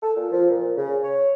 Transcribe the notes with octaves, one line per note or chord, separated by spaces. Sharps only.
A4
A#2
F3
A#2
C#3
C#5